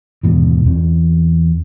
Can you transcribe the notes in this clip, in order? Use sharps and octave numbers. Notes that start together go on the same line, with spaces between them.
D#2 G#2 B2 E3
E2 E3 C4